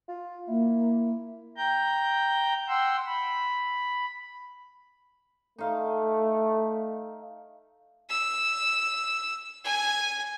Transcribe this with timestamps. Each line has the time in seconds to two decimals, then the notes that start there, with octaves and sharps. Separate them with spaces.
0.08 F4
0.48 A#3 E4
1.57 G5 A#5 G6
2.68 F#5 G5 C6 E6
3.06 B5
5.58 A3 D#4 F5
8.09 E6
9.65 G#5